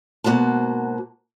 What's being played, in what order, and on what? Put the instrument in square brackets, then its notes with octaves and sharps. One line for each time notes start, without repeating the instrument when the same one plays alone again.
[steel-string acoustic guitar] G#2 B2 A#3 F#4 C5 A5